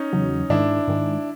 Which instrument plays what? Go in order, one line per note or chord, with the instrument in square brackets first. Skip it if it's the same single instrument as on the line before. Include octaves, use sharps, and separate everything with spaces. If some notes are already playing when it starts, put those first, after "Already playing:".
Already playing: [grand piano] C#4 D#4
[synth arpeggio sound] E2 C#3 F#3
[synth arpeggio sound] G#2 D#3 G#3 [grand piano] D4 E4
[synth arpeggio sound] G#2 D#3 G#3